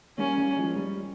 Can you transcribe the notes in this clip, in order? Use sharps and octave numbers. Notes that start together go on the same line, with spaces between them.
G3 A#3 C#4
G3 A#3
F3 G#3
G3